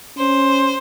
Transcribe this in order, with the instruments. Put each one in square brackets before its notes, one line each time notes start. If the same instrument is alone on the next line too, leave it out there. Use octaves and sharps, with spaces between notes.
[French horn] C#4 [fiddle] C5